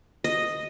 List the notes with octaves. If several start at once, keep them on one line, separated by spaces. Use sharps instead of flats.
D#5